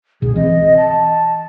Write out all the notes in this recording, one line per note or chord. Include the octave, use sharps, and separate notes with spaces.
C#2 B2 G#4
E3 C4 D#5
A5